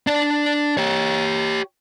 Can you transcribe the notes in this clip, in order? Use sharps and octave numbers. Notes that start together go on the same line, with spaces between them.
D4 D5
G4 C#5